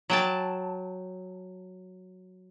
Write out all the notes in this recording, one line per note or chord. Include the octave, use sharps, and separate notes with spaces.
F#3 G5 A5